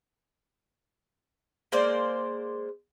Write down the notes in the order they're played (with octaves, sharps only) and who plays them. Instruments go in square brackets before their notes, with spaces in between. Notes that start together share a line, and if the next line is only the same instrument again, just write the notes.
[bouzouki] G#3 A#3 C5 D5